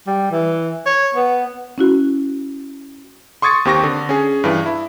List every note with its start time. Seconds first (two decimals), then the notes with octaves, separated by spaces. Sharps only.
0.07 G3
0.31 E3
0.86 C#5
1.16 B3
1.78 C#4 E4 F#4
3.42 C6 C#6 D#6 G#6 A6 C#7
3.65 D#2 C4 G4 C#6 A#6
3.83 D3
4.09 C#4 G#4
4.44 G2 E3
4.66 E4